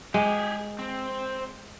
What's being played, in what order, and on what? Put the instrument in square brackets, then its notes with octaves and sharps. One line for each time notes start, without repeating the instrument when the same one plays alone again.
[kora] G#3 [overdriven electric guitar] G4 G#4
[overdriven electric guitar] C4